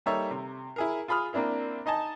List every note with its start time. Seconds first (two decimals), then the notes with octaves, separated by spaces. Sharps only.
0.06 G3 A#3 D#4 A4 C#5 E5
0.31 C3
0.76 E4 G#4 A#4
1.08 F4 G#4 B5 D#6 F6
1.33 A#3 C4 D4 E4 A#4
1.86 D#4 D#5 G#5 A5